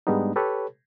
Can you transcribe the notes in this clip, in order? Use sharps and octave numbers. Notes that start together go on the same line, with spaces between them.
G#2 G3 G#3 B3 D4 D#4
G4 A4 B4 C#5